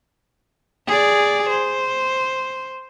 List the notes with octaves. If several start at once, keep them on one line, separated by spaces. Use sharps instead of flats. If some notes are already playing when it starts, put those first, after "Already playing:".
G#4 D5
C5